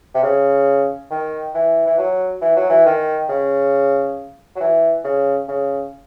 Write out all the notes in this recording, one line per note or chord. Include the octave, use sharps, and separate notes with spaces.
C3
C#3
D#3
E3
E3
F#3
E3
F#3
E3
D#3
C#3
F#3
E3
C#3
C#3